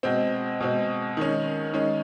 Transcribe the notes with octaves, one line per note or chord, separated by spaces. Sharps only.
B2 G#3 C4
B2 G#3 C4
D#3 G#3 C#4
D#3 G#3 C#4